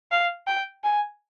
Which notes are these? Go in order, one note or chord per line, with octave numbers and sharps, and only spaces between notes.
F5
G5
G#5